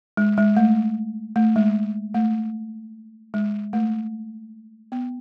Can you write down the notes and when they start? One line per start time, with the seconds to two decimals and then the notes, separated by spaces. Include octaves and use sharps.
0.17 G#3
0.38 G#3
0.57 A3
1.36 A3
1.56 G#3
2.14 A3
3.34 G#3
3.73 A3
4.92 B3